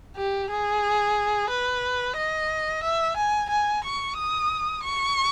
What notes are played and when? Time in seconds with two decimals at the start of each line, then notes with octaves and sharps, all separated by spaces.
0.17 G4
0.51 G#4
1.50 B4
2.17 D#5
2.83 E5
3.17 G#5
3.50 G#5
3.84 C#6
4.17 D#6
4.83 C#6